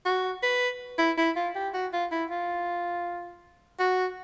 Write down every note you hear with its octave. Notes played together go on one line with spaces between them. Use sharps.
F#4
B4
E4
E4
F4
G4
F#4
F4
E4
F4
F#4